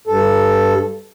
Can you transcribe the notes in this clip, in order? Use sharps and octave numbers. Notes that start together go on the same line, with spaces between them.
G2 A4